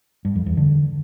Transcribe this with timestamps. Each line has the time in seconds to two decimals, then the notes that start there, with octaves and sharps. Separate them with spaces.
0.25 G2
0.36 F2
0.46 E2
0.57 D3